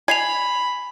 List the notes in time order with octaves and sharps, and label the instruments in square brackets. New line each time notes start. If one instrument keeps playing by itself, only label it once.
[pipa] G#5 [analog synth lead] B5 [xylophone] G#6 C7 F7